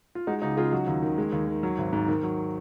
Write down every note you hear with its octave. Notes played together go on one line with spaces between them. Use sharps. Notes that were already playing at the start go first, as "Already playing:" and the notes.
F4
G#3 D#4 F#4
C#2 D#4 F#4
C#3 F4 G#4
F#3 D#4 F#4
D#2
D#3
G#3
D#2
D#3
F#3
G#1
G#2
D#3
F#3